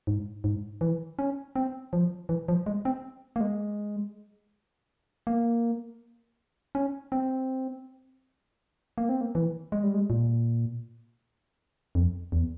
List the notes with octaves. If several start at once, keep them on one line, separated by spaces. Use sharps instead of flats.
G#2
G#2
E3
C#4
C4
F3
E3
F3
G#3
C4
A#3
G#3
A#3
C#4
C4
A#3
C4
A#3
E3
G#3
G3
G#3
A#2
F2
E2